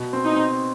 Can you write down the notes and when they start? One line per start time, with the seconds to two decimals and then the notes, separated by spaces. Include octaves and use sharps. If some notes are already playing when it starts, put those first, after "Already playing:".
Already playing: B2
0.13 C4
0.25 D#4
0.36 C4